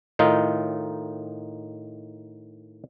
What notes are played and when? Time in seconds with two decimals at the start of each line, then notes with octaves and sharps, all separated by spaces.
0.19 A2 D#3 D#4 F4